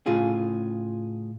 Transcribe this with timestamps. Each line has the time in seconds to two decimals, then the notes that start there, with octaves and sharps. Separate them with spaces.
0.06 A2 C#3 F4 G#4